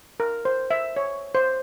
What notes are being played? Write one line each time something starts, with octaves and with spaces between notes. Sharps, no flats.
A#4
C5
E5
C#5
C5